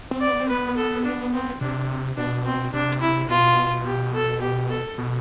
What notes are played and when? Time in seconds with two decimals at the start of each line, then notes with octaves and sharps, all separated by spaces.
0.11 C4
0.21 D5
0.31 B3
0.40 C4
0.49 B3 B4
0.77 A4
1.05 D4
1.33 C4
1.61 C3 D4
2.17 B2 D4
2.45 C4
2.73 C3 D4
3.02 E4
3.29 B2 F4
3.86 G4
4.14 A4
4.42 G4
4.70 A4
4.98 B2